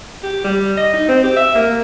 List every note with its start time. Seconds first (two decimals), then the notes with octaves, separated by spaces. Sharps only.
0.24 G4
0.44 G3
0.78 D#5
0.94 D#4
1.09 C4
1.24 G4
1.37 E5
1.55 A#3